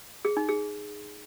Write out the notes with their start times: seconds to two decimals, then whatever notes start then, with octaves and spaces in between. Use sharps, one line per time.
0.25 G#4
0.37 D#4
0.49 G#4